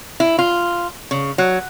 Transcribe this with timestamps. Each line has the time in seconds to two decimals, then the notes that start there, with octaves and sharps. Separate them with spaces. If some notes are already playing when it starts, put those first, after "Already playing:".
0.20 E4
0.39 F4
1.11 C#3
1.38 F#3